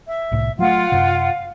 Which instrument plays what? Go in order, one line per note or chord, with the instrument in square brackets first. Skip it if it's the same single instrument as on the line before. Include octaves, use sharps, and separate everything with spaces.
[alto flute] E5
[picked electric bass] C2 A2 C3
[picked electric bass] F#3 A3 [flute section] F4 F#5 [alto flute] F5
[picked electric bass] F#2 C3